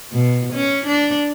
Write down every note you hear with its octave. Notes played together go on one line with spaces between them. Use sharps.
B2
C#4
D4